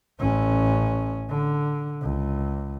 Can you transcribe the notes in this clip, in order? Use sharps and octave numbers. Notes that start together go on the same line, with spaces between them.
A1 C#4
D3
C#2